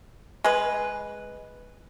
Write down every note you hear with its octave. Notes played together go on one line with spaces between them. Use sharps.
G#3 B4